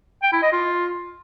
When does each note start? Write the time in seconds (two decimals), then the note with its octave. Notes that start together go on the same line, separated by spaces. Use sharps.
0.23 G5
0.33 E4
0.43 D#5
0.52 F4